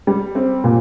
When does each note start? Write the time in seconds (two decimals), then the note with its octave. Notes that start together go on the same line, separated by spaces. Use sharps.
0.07 G3
0.35 C4
0.64 A#2